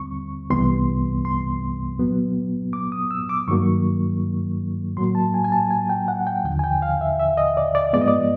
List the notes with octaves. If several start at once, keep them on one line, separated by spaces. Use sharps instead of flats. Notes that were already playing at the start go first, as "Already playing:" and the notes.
Already playing: D#2 D3 G3 C4 C#6
C2 C3 E3 G3 B3 C6
C6
A#2 F#3 B3
D6
D#6
E6
D6
G2 D#3 F#3 A#3 C#6
A2 F#3 A#3 C6
A5
G#5
G#5
A5
G#5
G5
F#5
G5
D#2 D3 F3 G5
G#5
G5
F5
E5
E5
D#5
D5
D5
G#2 F3 G#3 B3 D5
D#5
D5